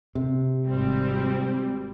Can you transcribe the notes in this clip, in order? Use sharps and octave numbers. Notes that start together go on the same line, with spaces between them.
C3
G#1 G3 C4